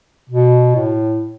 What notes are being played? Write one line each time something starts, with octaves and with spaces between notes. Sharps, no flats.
B2
A2